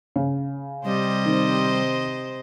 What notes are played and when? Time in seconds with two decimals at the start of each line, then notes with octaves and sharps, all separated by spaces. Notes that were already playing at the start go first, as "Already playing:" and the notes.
0.16 C#3
0.85 C3 G3 C5 D#5
1.25 D#3 C4